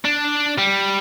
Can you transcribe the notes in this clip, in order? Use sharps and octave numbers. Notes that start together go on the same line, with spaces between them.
D4
G3